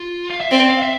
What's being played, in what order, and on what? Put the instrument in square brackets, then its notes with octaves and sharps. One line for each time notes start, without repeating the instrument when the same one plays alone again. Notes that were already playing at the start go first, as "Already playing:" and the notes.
Already playing: [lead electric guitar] F4
F5
E5
[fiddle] C4 [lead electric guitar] D5
[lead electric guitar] F5
E5